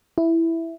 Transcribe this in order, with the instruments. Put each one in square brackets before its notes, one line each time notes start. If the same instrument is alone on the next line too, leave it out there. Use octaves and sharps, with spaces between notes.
[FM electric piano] E4